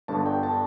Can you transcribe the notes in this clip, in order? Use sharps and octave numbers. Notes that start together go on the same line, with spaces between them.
G1 G2 D3 A5
G5
A5